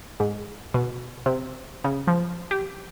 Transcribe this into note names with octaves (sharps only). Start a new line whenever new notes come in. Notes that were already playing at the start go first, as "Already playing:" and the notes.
G#2
B2
C3
C#3
F3
G4